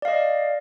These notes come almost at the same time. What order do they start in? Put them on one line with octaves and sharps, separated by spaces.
D5 F5 D#5